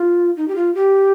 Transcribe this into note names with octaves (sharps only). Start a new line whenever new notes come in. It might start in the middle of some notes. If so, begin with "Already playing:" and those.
Already playing: F4
D#4
G4
F4
G4